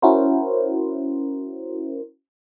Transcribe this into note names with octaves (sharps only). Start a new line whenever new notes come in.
C#4 E4 F#4 A#4 C5